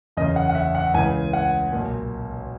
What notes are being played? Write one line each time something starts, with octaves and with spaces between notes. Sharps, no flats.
F#1 E2 C#3 D#5
F#5
F#5
E5
F#5
C#2 C#3 E3 G#5
F#5
B1 A#2